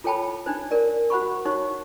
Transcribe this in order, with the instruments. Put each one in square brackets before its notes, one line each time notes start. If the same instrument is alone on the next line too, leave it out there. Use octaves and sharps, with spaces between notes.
[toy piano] F4 A4 C#5 G5 A5 B5
D4 D#4 C5
A#4 D5
F#4 C5 F#5 B5 C#6
D#4 F#4 C5 C#5 C#6